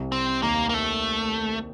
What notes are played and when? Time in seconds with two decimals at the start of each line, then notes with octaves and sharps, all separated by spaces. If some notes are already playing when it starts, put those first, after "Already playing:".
Already playing: C2 C3
0.12 C4
0.43 D#2 D#3 A#3
0.69 A#3
0.74 A3